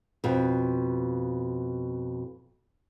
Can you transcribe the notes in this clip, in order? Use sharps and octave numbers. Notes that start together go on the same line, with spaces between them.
F2 B2